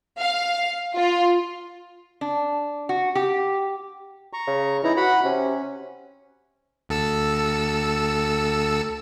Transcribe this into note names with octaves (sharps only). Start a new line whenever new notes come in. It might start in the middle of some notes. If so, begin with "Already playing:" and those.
F5
F4
D4
F#4
G4
A#5 C#6
C#3
E3 D#4 E4 A#5
F#4 F#5 B5
C3 C#4
D2 A4 E6